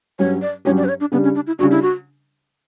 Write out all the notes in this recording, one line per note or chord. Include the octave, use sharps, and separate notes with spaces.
G2 F#3 C#4 G4 C#5
D5
G2 F#3 C#4 G4 C#5
D5
B4
C#5
D4
C#3 G3 B3 D4
C#4
D4
E4
C#3 G3 D4 F#4
E4
F#4